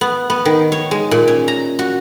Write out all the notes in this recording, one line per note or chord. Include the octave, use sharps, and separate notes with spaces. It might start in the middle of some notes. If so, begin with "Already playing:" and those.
B3
B3
D#3
C#5
G#3
A#2
C#4
A#5
F#4